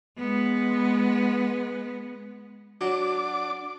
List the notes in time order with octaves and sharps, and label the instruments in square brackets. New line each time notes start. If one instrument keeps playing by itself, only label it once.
[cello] G#3 B3
[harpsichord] F#3 F#4 [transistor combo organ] D4 D6